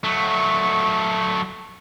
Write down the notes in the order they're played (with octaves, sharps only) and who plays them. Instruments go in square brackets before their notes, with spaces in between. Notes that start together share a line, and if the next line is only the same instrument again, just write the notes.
[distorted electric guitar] F#3 A3